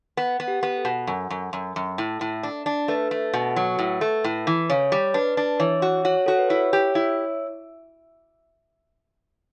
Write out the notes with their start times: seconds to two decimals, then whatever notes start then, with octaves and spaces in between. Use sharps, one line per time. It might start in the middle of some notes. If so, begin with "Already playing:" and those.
0.17 B3
0.40 B3
0.48 G4
0.63 B3
0.78 A4
0.85 B2
1.07 F#2
1.30 F#2
1.53 F#2
1.76 F#2
1.98 A2
2.21 A2
2.43 D4
2.66 D4
2.88 A3 B4
3.11 A3
3.34 B2
3.56 F#3
3.79 A2
4.01 A3
4.24 A2
4.47 E3
4.70 C#3 C#5
4.92 G3
5.14 D4 B4
5.37 D4
5.60 E3 C#5
5.82 F#4
6.05 F#4 C#5
6.26 F#4 A4
6.38 B4
6.50 E4 C#5
6.73 G4
6.95 E4